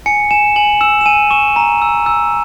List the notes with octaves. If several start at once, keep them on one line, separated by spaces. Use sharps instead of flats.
G#5 C#7
G#5 E7
G#5 F#7
E6 E7
E7
G#5 D#7
C#6 E7
A#5
E6
E6